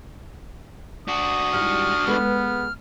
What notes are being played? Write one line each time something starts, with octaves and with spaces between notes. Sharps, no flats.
D4 F#4 D#6
G#2 G3 E4 F6
G#3 B3 A4 B4